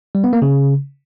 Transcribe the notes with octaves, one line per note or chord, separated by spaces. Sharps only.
G3
B3
A#3
C#3